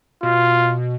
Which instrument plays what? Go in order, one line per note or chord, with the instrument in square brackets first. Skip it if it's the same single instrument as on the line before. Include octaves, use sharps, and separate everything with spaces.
[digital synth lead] B2 [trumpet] F4